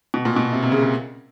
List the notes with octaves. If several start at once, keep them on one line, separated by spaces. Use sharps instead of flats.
B2
A#2
B2
C3
C3
C#3
C#3